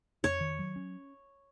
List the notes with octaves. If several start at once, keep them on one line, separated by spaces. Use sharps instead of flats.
F2 C#5
D#3
F#3
C#4